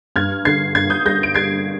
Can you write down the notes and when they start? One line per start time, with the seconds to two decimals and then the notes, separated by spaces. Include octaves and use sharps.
0.16 G2 F6 G#6
0.45 D3 G#6 C7
0.75 G2 G#6 C7
0.90 D#6 G6
1.05 G3 G6 A#6
1.23 D7
1.34 G3 G#6 C7